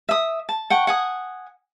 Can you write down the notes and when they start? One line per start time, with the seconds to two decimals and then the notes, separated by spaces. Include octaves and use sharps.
0.09 E5 D#6
0.49 A5
0.70 F#5 G5 C#6
0.87 F#5 G#5 D#6